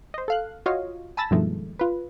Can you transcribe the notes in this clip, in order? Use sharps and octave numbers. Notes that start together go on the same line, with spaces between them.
C5 D#5
A4 F5 F#6
F4 F#4 C#5 D#5 F5
G#5 A5 B5 E6 A6 A#6
G2 B2 D#3 F3 G#3 A3
F4 B4